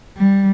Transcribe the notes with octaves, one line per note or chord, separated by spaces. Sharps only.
G3